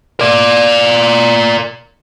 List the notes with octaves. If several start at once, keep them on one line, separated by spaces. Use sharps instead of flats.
A#4 D5